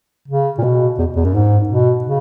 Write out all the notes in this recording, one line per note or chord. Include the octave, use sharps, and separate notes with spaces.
C#3
A#2
B2
E2
E2
F#2
G#2
B2
C#3